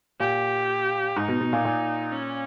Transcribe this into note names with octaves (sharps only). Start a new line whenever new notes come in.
A#2 G4
G#2 D#4
B2
B2
A#2
A#2
C#4